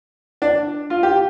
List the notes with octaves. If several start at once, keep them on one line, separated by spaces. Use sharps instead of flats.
D4
F4
G4